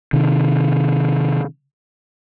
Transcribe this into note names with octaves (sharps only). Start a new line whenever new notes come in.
C3 D#3